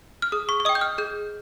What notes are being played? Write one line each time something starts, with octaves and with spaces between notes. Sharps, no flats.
F6
G#4 D#6
C#6
C#6
D#5 G5 D#6
G6
F6
G#4 G6